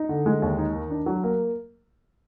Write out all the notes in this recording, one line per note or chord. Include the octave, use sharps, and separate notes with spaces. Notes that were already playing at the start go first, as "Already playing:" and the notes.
Already playing: D#4
D3
G#3
D#2
D#4
D#3
D4
F#3
A#3